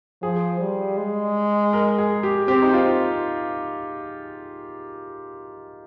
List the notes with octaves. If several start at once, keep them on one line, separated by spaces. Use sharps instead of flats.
F3 G#4
G3
G#3
A#4
G#4
G4
C4 G4
D#4
F4